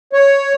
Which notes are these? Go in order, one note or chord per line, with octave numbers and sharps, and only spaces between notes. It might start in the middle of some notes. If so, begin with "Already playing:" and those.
C#5